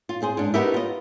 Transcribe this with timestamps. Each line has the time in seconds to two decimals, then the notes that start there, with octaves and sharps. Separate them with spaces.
0.09 F4
0.22 C4 G#4 C5
0.37 G#2 D4
0.54 B3 D#4 F#4 G4 A#4 E5
0.74 F4 D#5